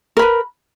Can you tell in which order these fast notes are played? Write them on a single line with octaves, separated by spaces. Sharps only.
A#4 B5 B4